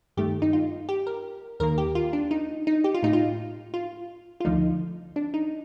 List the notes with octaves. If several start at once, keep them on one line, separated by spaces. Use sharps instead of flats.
G2 D#3 A3 G4
D#4
F4
G4
A#4
D#2 D#3 A#3 A#4
G4
F4
D4
D#4
D#4
G4
F4
A2 A3 D#4
F4
F4
F4
D2 D3 F3 A3 D#4
D4
D#4